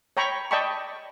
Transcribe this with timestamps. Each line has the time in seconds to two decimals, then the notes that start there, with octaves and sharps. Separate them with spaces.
0.17 C#5 G5 A#5 B5 C#6
0.51 D5 D#5 G5 A5 B5 C#6